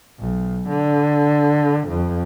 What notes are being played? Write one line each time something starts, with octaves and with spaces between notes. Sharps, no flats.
B1
D3
F2